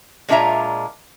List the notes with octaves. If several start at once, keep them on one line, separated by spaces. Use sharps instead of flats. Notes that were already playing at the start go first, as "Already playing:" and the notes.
A#2 G#3 D4 F4 E5 A#5